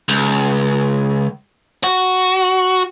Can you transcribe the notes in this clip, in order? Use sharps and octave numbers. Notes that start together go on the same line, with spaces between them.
C#2
F#4